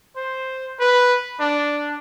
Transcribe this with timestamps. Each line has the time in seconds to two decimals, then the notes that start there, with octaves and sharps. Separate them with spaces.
0.16 C5
0.80 B4
1.40 D4